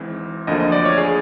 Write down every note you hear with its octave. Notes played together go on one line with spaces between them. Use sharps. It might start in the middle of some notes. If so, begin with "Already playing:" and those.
Already playing: G#1 G#2 E3 G#3 C4
D2 D3 F3 A#3 D#5
D#5
D5
C#5
G#4